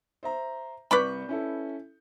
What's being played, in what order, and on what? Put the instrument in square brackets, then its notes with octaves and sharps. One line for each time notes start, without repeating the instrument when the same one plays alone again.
[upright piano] C5 E5 A#5
[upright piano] C2 C#6 G6 [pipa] B4 D5 B5
[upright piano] C#4 E4 A4